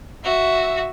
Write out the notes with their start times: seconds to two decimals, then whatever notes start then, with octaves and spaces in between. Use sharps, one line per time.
0.24 F#4 E5